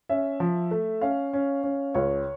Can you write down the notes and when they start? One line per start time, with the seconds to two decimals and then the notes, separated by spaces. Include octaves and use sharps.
0.09 C#4 E5
0.40 F3
0.71 A3
1.01 C#4 F5
1.33 C#4
1.64 C#4
1.94 C#2 C#5